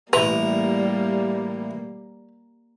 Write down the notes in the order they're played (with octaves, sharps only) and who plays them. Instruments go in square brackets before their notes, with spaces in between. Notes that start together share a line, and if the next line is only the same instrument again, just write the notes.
[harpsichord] A1 E3 A#5 [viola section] G3 [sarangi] A#3 [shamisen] B4